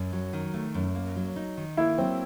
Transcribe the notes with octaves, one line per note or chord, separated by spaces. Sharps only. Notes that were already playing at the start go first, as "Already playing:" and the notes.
Already playing: F#2
F#3
D#3
A3
F#2
A#3
F#3
D#4
D#3
A#3 E4
F#3 C4